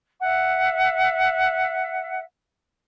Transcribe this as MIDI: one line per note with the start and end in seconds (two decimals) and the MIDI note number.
0.21 2.20 76
0.21 2.20 78